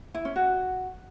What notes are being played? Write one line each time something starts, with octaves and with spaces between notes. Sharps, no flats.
E4
C#4
F#4